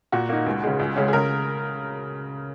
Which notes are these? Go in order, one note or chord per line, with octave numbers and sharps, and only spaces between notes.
A#2 F#4
A#3 D#4
C#2
C#3 G#3
C#2
C#3 G#3 C#4
G#4
C#3 A#4